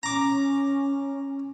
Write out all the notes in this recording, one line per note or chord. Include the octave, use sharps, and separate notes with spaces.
C#4 A#5 D6